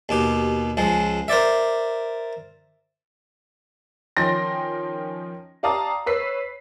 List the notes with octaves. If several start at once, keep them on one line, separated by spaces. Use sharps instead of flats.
D#2 B2 G4
C#2 F3 G#3
A#4 C5 D5 E5
D#3 F3 C#4 G5 C6 A#6
G4 D5 F5 A5 A#5 D#6
B4 C#5 E6 B6 C7